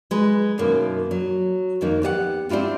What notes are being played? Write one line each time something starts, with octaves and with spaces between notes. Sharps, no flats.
G#3 B4
F#2 B2 D#3 A#3 E4
F#3
F2 D#3 A#3 D#4
B3 G4 D#5 F#5
C4 D4 E4 F4 G4